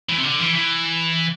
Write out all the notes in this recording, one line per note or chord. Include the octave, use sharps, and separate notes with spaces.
E3
C3
D3
E3
E3